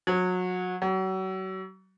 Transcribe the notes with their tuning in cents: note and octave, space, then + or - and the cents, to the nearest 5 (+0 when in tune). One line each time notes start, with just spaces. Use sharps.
F#3 -25
F#3 +35